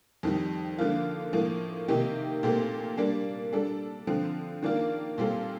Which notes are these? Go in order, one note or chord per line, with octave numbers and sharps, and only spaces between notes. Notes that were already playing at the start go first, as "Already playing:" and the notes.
F2 D#3 G3
D3 F3 A#3 F4
A2 F3 A#3
C3 D#3 A#3 D#4 G4
A#2 A3 C4 G4 A#4
G3 A#3 D4
G3 D4 A4
D3 F3 C4
D#3 A#3 D4 F4 A#4
A#2 G3 C4 F4 A4